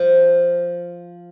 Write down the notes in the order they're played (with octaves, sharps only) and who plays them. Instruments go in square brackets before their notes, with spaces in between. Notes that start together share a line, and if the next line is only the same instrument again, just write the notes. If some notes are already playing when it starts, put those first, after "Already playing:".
Already playing: [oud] F3